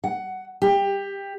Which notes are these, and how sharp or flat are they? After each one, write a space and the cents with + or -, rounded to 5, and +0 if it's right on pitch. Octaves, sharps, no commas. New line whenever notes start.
F#5 +15
G4 +20